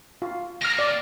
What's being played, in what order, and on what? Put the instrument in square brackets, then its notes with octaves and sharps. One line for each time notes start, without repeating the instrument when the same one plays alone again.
[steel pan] F4
[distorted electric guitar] D#2 A#2 [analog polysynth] F6 A#6
[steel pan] D5